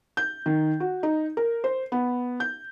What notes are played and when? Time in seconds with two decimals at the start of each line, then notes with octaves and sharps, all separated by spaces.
0.17 G6
0.46 D#3
0.80 F#4
1.03 D#4
1.37 A#4
1.64 C5
1.92 B3
2.40 G6